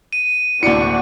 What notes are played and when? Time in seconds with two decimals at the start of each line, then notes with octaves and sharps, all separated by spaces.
0.13 D#7
0.63 D1 A#3 D4 E4 F#4 D5 C#7